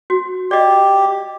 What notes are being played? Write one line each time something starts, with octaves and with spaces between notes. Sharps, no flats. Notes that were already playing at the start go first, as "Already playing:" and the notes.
F#4
G4 D5 D#5